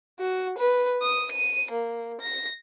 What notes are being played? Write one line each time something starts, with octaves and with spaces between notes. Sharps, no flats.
F#4
B4
D#6
D#7
A#3
A#6